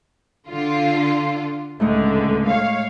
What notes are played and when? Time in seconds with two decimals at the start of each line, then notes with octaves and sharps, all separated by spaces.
0.49 D3 F4
1.80 C#2 A2 D3 G#3 D#4
2.49 C#5 F5